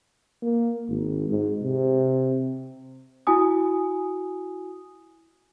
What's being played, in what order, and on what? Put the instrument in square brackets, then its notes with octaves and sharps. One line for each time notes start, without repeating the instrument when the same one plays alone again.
[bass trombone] A#3
G#1
G#2
C3
[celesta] E4 F#4 G#5 D#6